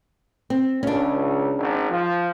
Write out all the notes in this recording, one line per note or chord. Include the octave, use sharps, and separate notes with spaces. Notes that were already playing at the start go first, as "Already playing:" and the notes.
C4
C#2 C#4 D4
G#1
F3